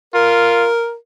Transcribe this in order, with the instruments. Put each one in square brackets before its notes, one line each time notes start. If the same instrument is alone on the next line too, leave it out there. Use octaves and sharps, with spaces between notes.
[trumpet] F4 [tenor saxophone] A#4